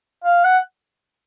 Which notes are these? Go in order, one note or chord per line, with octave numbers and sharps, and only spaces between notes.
F5
F#5